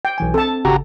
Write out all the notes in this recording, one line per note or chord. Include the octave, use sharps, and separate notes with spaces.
G5
B1 E3 G#5
C4 A4 A5
G#1 C#3 F#4 G4 A#5